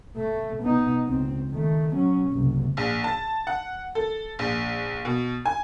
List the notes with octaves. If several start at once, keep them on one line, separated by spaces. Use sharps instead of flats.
A3
B3 D#4
C#2 C4
D#3 A3
F#3 C#4
F#1 C2
A#1
A5
F#5
A4
A#1
B2
G#5